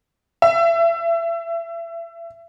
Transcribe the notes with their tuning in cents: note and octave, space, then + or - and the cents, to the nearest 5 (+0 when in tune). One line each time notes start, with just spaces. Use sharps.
E5 +30